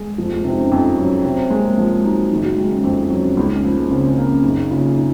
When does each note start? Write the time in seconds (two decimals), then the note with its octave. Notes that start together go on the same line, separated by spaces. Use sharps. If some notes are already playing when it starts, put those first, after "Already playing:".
Already playing: G#3
0.18 F1 F3
0.31 G#3
0.44 C3 C4
0.52 D#4
0.58 C#4
0.71 F2 D#4
0.98 F#3 C#4
1.24 C3 C4
1.50 G#3 A#3
1.59 C4
1.67 A#3
1.78 F3 G#3
2.04 F#3 D#4
2.31 F#1 D#3
2.45 F#3
2.57 D#3 G#3
2.71 C#4
2.84 F2 C4
3.10 F#3 C#4
3.37 C#2 D#4
3.50 C#4
3.64 F3 A#3
3.77 G#3
3.90 C#3 C4
4.08 C4
4.18 A#3
4.26 C#4
4.43 F#1 D#4
4.71 C#3 F4
4.97 D#4